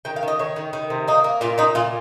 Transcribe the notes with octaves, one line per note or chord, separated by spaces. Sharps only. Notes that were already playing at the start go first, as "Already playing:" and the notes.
D#3 G5
F5
D#3
D#5
D#3 C#5
D#3
D#3
C3
A#3 D#4
A#3
A#2 F4
A#2 D#4
A#2 F4